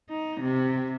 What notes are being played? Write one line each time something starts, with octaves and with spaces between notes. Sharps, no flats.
D#4
C3